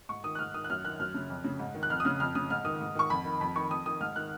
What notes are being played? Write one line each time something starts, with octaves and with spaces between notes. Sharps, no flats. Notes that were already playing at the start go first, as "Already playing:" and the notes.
G#2 C#6
D#3 D#6
F#6
G#2 F6
D#3 D#6
F#6
F#2 F6
D#3 F#6
F#2 F6
C#3
F2
C#3
G#2
D#3
F#6
F2 F6
D#6
C#3 F6
F2 F6
C#3 D#6
G#2 F6
D#3 D#6
G#2
D#3 C#6
F2 B5
D#3
F2 B5
D#3 C#6
F2 D#6
D#3 D#6
G#2 F6
D#3 F#6